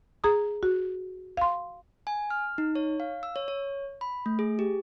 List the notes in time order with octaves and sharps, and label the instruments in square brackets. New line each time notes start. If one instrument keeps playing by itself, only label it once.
[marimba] G#4 A#5 D#6
F#4
F5 C6
[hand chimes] G#5
F6
D#4
C#5
F5
E6
C#5
C#5
B5
A3
G#4
G4